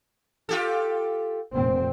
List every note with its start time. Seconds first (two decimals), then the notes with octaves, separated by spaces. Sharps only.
0.49 F4 G4 A4
1.54 F1 A#2 C4